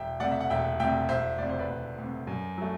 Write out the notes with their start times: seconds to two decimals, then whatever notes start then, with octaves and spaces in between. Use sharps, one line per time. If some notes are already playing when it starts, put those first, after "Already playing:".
Already playing: E1 E5 G5
0.20 D2 C3 D5 F#5
0.31 E5
0.41 F#5
0.50 E1 E5 G5
0.80 D2 C3 E5 G5
1.09 E1 C5 E5
1.38 D2 C3 D5
1.49 C5
1.59 B4 D5
1.69 E1
1.98 D2 C3
2.27 F#2
2.58 F#3 A3